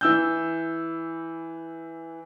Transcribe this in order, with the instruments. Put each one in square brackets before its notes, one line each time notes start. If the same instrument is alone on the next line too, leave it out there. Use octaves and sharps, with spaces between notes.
[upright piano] E3 E6 G6